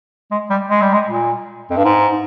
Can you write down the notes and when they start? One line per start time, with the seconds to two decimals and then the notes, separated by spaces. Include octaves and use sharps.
0.31 G#3
0.50 G3
0.70 G#3
0.82 G3
0.94 G#3
1.08 A#2
1.71 F2
1.77 G2
1.85 G#2